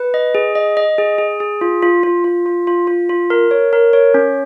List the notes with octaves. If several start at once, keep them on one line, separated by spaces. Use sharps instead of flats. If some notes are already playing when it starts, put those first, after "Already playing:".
Already playing: B4
D#5
G#4
D#5
D#5
G#4
G#4
G#4
F4
F4
F4
F4
F4
F4
F4
F4
A#4
C#5
A#4
C#5
C#4